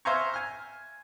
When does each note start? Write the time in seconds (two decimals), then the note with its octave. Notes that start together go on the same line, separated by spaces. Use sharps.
0.05 C5 E5 F5 G#5 A#5 C#6
0.34 G#5 F6